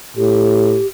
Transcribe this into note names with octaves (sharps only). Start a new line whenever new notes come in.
A2 G4